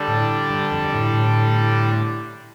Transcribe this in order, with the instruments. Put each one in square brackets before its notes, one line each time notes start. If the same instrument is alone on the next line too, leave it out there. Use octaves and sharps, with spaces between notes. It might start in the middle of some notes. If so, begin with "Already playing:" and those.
Already playing: [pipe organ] D3 G3 D4 A4
[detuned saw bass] A2
G2
F2
A2
A2